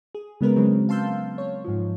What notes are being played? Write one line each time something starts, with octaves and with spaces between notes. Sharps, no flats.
G#4
C#3 G#3 B3 A#4 B4
C#3 F#3 G#3 C4
F5 A5 C6 E6 G6
C#5
G#2 F3